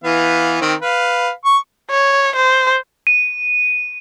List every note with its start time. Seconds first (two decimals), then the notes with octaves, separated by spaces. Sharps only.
0.04 E3 B3 F5
0.61 D#3 C4
0.82 B4 F5
1.45 C#6
1.90 C#5
2.36 C5
3.07 D#7